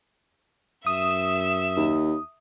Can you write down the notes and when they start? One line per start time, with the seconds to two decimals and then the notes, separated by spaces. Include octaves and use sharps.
0.86 F#2 E5 D#6 E7
1.77 D#2